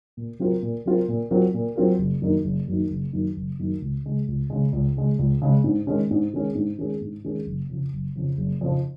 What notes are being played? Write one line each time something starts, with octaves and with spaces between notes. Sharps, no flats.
A#2
F#3 C4 F4 A#4
A#2
F#3 C4 F4 A#4
A#2
F#3 C4 F4 A#4
A#2
F#3 C4 F4 A#4
F#1
F#2 D#3 A#3 D#4
F#1
F#2 D#3 A#3 D#4
F#1
F#2 D#3 A#3 D#4
F#1
F#2 D#3 A#3 D#4
C#2
C#3 G#3
C#2
C#3 G#3
C#2
C#3 G#3
C#2
C#3 G#3
G#2
D#3 G#3 C#4 G#4
G#2
D#3 G#3 C#4 G#4
G#2
D#3 G#3 C#4 G#4
G#2
D#3 G#3 C#4 G#4
F#1
F2 C#3 F3
F#1
F2 C#3 F3
F#1
F2 C#3 F3